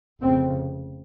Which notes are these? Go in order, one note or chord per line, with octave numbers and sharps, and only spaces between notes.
F1 F2 C#3 C4